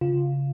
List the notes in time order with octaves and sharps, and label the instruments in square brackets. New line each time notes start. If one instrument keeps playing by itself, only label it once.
[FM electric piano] C#3 F4